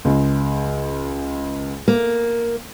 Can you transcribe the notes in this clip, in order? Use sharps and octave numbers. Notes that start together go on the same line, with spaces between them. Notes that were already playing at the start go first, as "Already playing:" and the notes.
C#2
A#3